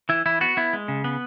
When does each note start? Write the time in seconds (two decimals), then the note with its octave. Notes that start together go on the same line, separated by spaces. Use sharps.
0.09 E3 E4
0.26 E3 E4
0.41 B3 F#4
0.57 B3 E4
0.73 G#3
0.88 C#3
1.04 B3